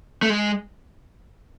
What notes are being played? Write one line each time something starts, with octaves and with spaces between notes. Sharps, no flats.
A3
G#3